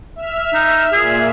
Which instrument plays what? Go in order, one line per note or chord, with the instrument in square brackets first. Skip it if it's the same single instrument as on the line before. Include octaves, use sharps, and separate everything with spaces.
[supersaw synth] E5 F6
[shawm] D#4
[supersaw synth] A#2 [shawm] G#4